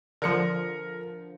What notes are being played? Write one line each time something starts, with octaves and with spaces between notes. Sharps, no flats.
D3 F3 A#4 C#7